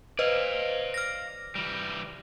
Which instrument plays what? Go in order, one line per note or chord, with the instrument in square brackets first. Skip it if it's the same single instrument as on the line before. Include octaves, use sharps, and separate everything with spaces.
[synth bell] B4 C5 D#5 [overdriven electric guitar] D5 F5
[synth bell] F6 A#6
[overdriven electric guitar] E3 G3